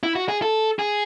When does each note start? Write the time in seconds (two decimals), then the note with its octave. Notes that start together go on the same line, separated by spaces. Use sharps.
0.03 E4
0.16 F#4
0.29 G#4
0.42 A4
0.79 G#4